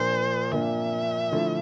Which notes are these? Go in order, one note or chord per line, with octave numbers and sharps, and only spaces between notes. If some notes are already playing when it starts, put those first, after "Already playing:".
Already playing: A#2 F3 A#3 D4 C5
A#2 F3 A#3 D4 E5
D3 F3 A3 E4